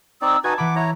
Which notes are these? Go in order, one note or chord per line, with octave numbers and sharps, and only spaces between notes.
C4 D#4 D5 E6
D#4 F#4 B4 G#5 A5 G#6
E3 F#5 B5 D6
E4 C#5 A#5